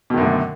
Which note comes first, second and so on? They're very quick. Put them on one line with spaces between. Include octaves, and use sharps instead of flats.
B2 D#3 F#2 D3 A3